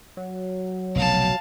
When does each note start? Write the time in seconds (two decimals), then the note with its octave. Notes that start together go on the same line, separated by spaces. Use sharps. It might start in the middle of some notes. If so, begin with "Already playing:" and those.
0.17 F#3
0.96 F1 B1 B2 F5 A5